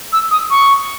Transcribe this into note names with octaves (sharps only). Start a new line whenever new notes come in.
E6
D#6
C#6